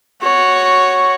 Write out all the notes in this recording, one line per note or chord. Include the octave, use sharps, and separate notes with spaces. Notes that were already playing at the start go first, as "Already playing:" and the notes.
F#4 C#5